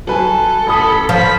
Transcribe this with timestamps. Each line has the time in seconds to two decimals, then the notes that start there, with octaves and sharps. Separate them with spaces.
0.08 F#3 A4 B4 G#5
0.67 A1 A5 B5 D#6
1.09 F3 B6